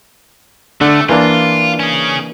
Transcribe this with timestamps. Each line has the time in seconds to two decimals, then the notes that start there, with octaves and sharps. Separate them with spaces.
0.81 D3 A3 D4
1.09 E3 A#3 D4 F4
1.80 C#4 G#4